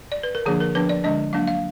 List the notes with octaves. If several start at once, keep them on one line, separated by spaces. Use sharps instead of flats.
D5
B4
A#4
D3 F3 A#3 D4 G#4
A#4
F3 B3 D4 B4
D5
D3 G#3 D4 D#5
F#3 A#3 D4 F5
F5